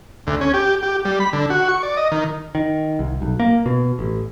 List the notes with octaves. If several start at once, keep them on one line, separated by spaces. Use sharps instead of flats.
D2
C#4
G4
G4
G3
B5
D3
F#4
C#6
D5
D#5
D#3
D#3
C2
B1
A#3
B2
A1